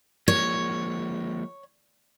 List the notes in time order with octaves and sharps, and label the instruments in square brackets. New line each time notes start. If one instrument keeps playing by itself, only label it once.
[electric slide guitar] F3 G#3 A#3 [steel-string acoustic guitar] C#5